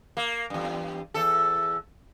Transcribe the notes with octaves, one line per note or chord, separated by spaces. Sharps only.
A#3
E2 G2
E2 A4